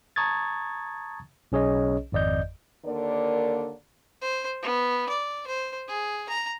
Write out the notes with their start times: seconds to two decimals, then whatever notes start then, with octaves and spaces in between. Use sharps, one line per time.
0.16 A5 A#5 C#6 D#6 G#6 A6
1.52 B1 C#4 G#4 C#5 D#5
2.12 G#1 F2 D5 D#5 G6
2.85 D#2 D3 A#3 A#4 D5
4.21 C5
4.62 B3
5.09 D5
5.47 C5
5.88 G#4
6.29 A#5